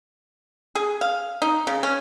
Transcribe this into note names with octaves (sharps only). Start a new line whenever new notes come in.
G#4
F5
D#4
C#3
C#4